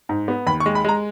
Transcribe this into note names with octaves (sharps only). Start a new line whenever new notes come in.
G#2
B3
D#2 B5
C#6
G#3
B5
G#3 A#5